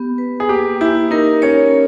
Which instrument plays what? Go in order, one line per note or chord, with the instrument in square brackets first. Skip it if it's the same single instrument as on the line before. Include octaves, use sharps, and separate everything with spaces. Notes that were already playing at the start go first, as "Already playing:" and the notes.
Already playing: [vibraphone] B3 G4
B4
[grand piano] G#4
[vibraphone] A#3 [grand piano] G4
[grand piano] E4 [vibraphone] G4
[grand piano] D#4 [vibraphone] A#4
[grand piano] C#4 [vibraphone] C#5